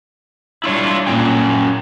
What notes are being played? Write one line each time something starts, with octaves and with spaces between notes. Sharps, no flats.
G3 D4 E4 F4 C#5
A#2 F#3 C#4 G5